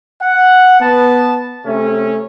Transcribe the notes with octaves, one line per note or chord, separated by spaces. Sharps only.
F#5
B3 A5
C3 A3 C#4